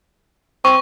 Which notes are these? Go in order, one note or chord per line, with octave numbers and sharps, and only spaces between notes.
C4 C#6